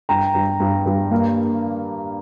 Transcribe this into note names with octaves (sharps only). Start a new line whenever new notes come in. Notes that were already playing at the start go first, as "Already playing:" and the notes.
G2 G5 A#5
G2
G2
G2
A#3